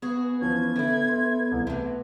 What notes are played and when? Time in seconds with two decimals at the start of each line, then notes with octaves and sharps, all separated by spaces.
0.02 B3 F#4 G#4
0.41 E3 F3 C#4 G#6
0.76 A2 D3 E4
1.08 E5 C6
1.52 C2 E3
1.67 C3 F#3 A3 B3